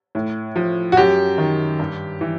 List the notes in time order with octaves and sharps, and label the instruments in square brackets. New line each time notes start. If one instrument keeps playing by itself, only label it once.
[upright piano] A2
F3
F#4
F#2 G4
D#3
G2
E3